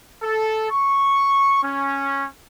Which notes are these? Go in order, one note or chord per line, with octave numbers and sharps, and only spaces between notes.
A4
C#6
C#4